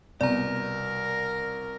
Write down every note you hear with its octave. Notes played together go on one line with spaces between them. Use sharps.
C2 B2 A#4 D5 A#5